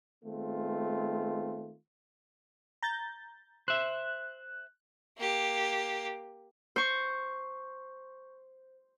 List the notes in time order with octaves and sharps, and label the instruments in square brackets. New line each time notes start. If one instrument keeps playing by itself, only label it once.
[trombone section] D#3 G#3 A3 B3 C4 F4
[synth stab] A#5 G6 A6
[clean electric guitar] C5 E5 [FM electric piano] F#6
[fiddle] A#3 G4
[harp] C5 C#6